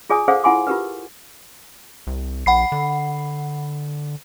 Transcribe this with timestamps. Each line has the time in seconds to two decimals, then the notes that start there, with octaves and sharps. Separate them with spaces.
0.10 F4 G#4 D5 G#5 D#6
0.28 G#4 A4 C5 D5 F5 F#5
0.44 E4 F4 F#5 G#5 C6 D6
0.67 F4 G4 A#4 B4
2.07 C2
2.46 A#1 F#5 B5 C7
2.72 D3